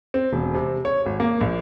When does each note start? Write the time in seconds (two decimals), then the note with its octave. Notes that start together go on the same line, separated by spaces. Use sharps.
0.14 C4
0.33 E1
0.54 C3
0.85 C#5
1.06 G#1
1.20 A#3
1.41 A#1